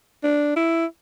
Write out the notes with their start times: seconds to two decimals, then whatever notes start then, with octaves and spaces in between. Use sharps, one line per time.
0.23 D4
0.56 E4